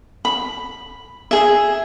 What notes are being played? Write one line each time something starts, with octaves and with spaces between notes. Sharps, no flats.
B5
G#4 E5